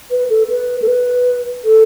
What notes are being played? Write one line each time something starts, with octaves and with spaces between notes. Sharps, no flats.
B4
A4
B4
A4
B4
A4